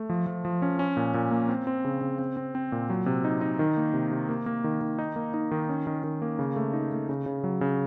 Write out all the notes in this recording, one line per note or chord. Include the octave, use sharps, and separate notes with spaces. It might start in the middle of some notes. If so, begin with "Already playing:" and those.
Already playing: A3
F3
F3
F3
C#4
C#4
A#2
A#2
A#3
C4
C4
C#3
C#3
C4
C4
C4
A#2
F#3
C3
D#4
D#4
D#3
A#3
C3
C3
A#3
A#3
D#3
D#3
D#4
A#3
D#4
D#3
C#4
D#3
D#3
A#3
C#3
A3
D#4
A3
C#3
C#3
F#3
C#3